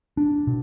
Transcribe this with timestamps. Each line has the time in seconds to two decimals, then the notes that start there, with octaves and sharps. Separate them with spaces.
0.17 D4
0.47 B2